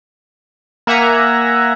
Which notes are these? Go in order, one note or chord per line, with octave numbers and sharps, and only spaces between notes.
A#3 E5 F#5 G#5 A#5